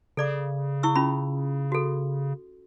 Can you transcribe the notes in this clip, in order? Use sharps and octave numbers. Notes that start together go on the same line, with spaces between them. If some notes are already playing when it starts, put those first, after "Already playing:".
C#3 A4 D5 D6
E4 C#6 E6
C#4 F4 B5
F#4 A4